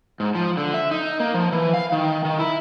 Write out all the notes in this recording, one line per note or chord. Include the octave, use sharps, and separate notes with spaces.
G#2
F3
D3
E5
D#4
A#3
F3
E3
F5
D#3
D#3
E4